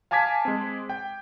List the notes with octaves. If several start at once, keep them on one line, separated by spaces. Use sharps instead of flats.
F5 G#5 A5 D6 G#6 B6
G#3 C4
G5